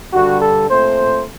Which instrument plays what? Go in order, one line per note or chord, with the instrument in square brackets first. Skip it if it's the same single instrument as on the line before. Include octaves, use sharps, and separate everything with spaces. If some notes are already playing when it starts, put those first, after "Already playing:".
[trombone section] G2 D3 G3 F#4
A4
A#2 A3 C4 C5